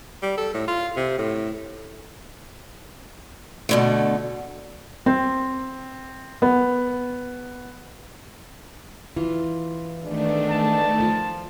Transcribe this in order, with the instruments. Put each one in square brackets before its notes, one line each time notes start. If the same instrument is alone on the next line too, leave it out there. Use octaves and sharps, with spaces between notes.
[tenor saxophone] G3
A4
A2
F4
C3
A2
[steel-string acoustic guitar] B2 D3 A3
[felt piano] C4
B3
[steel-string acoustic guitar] E3 F4
[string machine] D#3 A3 [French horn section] G#3 B3 D4
[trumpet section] A5
[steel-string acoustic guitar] F3 F4